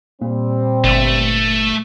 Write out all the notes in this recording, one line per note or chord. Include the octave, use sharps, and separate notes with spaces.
A#2 G3 C4
G1 A3